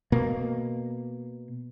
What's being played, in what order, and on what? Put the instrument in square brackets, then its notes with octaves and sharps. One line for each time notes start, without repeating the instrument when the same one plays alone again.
[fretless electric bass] B2 A#3